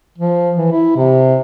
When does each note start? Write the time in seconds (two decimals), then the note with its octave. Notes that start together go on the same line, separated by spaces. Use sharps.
0.18 F3
0.56 E3
0.72 E4
0.97 C3